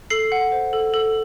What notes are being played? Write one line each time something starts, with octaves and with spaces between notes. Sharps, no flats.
A4 C7
F#5
C5
A4
A4